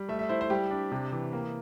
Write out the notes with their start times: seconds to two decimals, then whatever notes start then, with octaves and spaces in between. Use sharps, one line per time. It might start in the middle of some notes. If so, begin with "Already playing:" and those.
Already playing: G3
0.09 A3 E5
0.19 E5
0.29 E4 C5
0.41 C5
0.50 G3 G4
0.71 D4
0.92 C3
1.12 E3
1.33 A#3